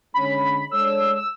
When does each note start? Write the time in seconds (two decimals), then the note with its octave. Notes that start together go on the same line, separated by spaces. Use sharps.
0.14 D3 G#3 C#4 B5
0.71 G#3 D4 A4 C#5 E6
1.15 E6